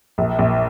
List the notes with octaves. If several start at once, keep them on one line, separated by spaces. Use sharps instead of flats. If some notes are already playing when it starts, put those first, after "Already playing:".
A#1
A#1